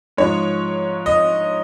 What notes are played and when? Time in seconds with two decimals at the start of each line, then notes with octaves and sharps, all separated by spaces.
0.17 G#2 F3 G#3 C#5
1.06 D#5